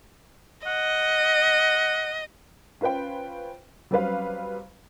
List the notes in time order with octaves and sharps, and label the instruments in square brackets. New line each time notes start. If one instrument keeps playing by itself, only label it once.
[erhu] D#5 [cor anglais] F#5
[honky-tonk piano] C#4 F4 B4 C5 G5
F#3 G3 C4 C#4 B4 F5